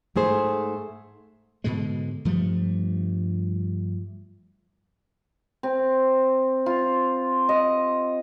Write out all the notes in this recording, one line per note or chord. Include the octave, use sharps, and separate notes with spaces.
G#2 A3 G#4 C5
G#2 B2 D3 G#3
G2 F3 G3 A3
C4
F4
D#5